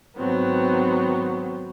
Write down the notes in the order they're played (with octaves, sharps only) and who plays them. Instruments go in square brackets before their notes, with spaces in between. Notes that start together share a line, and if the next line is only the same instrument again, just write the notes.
[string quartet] G#2 D#3 F#3 B3 C4